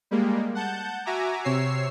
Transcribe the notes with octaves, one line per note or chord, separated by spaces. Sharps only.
G3 G#3 A#3
F#5 A5 G6
F#4 E5 G#5 A#5 D6
C3 C#5 E6 C7